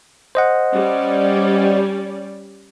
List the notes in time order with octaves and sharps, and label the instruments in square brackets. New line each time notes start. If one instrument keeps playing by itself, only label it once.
[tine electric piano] C5 D#5 F#5
[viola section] G3 C#4 D5